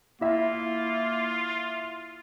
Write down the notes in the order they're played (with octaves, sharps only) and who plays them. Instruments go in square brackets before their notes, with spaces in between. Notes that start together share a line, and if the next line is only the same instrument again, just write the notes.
[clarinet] A#3 [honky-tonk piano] E4 E5 [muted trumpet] F4